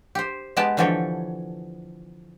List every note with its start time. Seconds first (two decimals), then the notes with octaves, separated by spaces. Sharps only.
0.15 G4 C5
0.57 G#3 B3 G4 G5 A5
0.77 D3 E3 F3 G4 A4 C#5